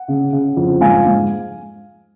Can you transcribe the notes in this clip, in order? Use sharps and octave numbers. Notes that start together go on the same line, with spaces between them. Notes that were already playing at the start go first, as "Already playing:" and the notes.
Already playing: F#5
C#3
C#3
F2
G#2 F5 G#5
G#2